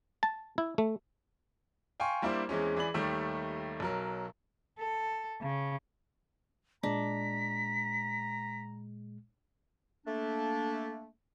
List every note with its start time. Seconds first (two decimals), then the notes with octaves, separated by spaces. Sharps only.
0.23 A5
0.58 E4
0.78 A3
2.00 F5 G5 G#5 C6 C#6
2.22 G3 A#3 D4 E4 C5
2.49 E2 E3 G#3 C4 C#4
2.77 E3 G#4 D5 B5 F#7
2.94 D#2 D#3 G3 A3 E5
3.80 B1 F#3 A#4
4.78 A4
5.41 C#3
6.83 A#2 G#3 D4 A#5 B6
10.07 A3 A#3 D4